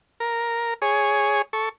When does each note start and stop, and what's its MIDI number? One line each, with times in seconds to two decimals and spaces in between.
0.20 0.74 70
0.82 1.42 68
0.82 1.42 73
1.53 1.69 69
1.53 1.69 85